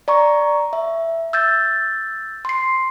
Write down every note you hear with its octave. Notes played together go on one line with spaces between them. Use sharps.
D5 A#5 C#6
E5
E6 G6 A6
C6 C7